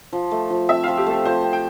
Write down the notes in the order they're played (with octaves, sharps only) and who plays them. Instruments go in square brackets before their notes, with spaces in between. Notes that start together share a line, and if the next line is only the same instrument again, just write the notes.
[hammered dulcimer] F3
A3
F3
[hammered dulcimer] C4 [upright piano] E5
[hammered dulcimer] F3 [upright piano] F5
[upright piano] G4
[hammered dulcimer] A3 [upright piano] A4
[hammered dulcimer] F3 [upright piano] C5
[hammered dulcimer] C4
[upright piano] G5